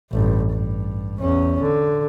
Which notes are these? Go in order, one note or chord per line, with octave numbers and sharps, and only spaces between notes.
A1 G2
G2
E2 C#4
D3